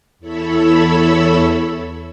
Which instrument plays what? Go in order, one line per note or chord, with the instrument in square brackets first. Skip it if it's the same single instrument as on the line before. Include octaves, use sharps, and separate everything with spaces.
[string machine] E2 E4 A4 C#5 B5 E6